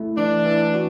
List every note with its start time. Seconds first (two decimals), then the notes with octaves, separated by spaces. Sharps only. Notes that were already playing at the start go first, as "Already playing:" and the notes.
Already playing: A3 E4
0.17 E3 D4
0.45 E3
0.74 F#4